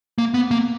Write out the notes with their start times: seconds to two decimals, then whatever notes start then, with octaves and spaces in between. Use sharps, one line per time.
0.18 A#3
0.34 B3
0.51 A#3